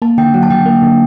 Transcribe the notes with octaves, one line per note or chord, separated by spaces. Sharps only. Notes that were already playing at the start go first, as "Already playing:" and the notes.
A#3 A5
D3 G5
F#3 F#5
A5
D3 G5
A#3
D3